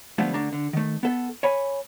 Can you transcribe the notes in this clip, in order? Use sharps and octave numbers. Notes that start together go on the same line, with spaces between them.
D3 F3 G3 A3 B3
D3 A3 D4 A#5
D3
D#3 A3
B3 A4
C#5 G#5 B5